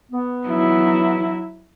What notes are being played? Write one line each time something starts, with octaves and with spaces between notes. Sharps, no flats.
B3
F#3 E4